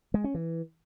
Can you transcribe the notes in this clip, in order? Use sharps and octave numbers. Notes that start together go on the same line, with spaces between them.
G#3
C#4
E3